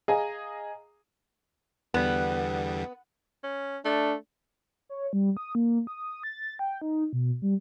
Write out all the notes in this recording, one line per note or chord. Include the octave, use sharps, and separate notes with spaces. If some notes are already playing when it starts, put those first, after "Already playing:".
G#4 D#5 F5 G#5 A#5
E2 D3 G3 B3
C#4
A3 D4
C#5
G3
D#6
A#3
D#6
A6
G5
D#4
B2
G3